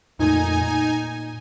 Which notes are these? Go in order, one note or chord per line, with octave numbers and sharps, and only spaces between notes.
F2 A#2 A3 D#4 G#5
A#2